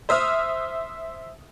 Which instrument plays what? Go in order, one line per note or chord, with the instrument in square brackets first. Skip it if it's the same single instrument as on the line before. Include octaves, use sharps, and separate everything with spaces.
[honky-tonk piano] C5 E5 D#6 F6